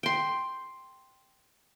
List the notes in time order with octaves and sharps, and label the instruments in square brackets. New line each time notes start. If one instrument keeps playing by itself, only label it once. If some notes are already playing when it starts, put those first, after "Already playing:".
[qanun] G5 C6